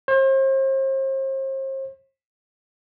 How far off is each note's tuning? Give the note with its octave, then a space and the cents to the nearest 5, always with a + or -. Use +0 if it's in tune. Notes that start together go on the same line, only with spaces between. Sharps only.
C5 +40